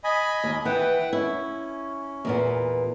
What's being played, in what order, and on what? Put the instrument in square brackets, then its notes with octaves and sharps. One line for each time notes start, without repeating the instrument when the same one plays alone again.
[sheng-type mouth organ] D#5 G#5 B5
[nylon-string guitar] D#2
[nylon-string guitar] E3 [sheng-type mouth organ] B4 F#5 G5
[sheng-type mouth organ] C#4 [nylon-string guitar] E4
[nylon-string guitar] E2 A#2 B3